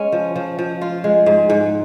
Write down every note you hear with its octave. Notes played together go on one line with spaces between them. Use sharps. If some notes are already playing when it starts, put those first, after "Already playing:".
Already playing: G#3 C#4
F3
F3
F3
F4
G#3
G#2
G#2